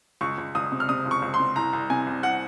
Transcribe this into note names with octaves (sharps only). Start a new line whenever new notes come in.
C#2 C#6
C#2
C#2 D#6
C3
F6
C3 D#6
C#2
C#6
C#2
C6
C4
C2 A#5
C2
C3 G#5
C2
F#5